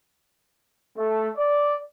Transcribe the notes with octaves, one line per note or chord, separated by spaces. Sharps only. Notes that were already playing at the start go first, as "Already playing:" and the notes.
A3
D5